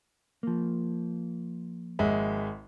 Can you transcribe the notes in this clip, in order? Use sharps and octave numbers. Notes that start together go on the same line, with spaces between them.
F3 A#3
G#1 G#3 E5